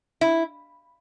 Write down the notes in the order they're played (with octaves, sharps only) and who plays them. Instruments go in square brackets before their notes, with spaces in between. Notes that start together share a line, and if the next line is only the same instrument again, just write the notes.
[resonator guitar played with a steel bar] E4